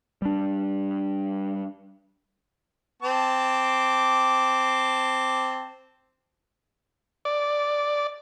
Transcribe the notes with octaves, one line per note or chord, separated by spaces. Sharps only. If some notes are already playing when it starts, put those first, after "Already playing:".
G3 D4
C4 A5 D6
D5